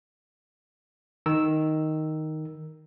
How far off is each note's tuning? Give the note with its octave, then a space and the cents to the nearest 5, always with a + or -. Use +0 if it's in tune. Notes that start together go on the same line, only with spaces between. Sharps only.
D#3 +0 A#4 +0 E6 +0